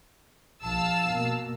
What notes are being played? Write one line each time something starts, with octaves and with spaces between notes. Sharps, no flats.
A#1 F5 A5 E6
B2 A#3